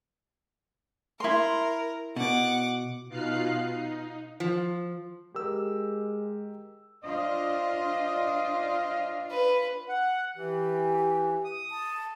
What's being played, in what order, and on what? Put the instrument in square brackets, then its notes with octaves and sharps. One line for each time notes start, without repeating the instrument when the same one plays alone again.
[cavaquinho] E4 C6 [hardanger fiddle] A#4
[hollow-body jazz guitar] B2 [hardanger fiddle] F#5 D6
[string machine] B2 D#4 F4 F5 F#6 C7
D#4
[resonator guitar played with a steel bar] F3
[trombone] G#3 [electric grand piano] G4 A#4 E6
[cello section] D4 F4 [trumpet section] C5 D#5
[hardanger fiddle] B4
[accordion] F#5
[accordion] E3 [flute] G4
[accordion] D#6
[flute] A5